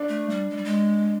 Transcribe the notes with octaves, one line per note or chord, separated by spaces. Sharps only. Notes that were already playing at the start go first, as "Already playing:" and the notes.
Already playing: D4
A3
G3
G#3
G3
G#3